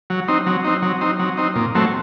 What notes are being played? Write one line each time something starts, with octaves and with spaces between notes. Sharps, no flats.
F#3
C4 D#4
F#3
C4 D#4
F#3
C4 D#4
F#3
C4 D#4
A#2
F#3 A3 C4